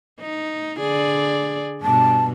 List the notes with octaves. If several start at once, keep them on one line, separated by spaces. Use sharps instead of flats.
D#4
D3 G#4 D5
G2 B2 A5